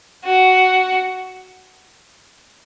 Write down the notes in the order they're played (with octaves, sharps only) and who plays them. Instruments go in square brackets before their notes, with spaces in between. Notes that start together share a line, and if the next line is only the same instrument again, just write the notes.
[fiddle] F#4